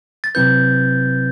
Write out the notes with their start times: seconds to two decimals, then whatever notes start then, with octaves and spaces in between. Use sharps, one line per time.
0.24 A6
0.35 C3 F#3 C4 E4 B4 G6